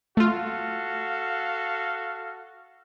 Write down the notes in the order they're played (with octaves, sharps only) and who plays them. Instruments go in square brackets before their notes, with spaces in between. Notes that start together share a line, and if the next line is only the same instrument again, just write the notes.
[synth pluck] A3 F4 [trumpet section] F#4 A4 F5